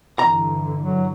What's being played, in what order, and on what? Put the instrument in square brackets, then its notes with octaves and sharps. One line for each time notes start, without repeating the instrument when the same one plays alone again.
[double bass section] G2 D3 E3 [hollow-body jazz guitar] A#5
[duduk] F#3